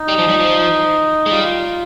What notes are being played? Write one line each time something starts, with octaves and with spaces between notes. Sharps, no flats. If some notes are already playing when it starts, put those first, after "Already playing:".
Already playing: D#4
G3
F3
G3
F3
G#3
G3 F4